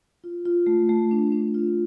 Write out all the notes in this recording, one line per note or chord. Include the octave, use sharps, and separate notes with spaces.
F4
F4
A3
A3
D4
D4
F4